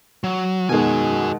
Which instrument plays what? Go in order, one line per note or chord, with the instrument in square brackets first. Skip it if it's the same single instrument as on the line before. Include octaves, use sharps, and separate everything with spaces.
[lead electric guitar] F#3
[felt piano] B2 D#3 G#3 [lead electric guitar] F#4 G#5